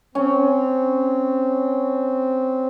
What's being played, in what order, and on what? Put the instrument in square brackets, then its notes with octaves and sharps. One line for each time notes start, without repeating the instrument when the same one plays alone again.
[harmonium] C4 [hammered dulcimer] C#4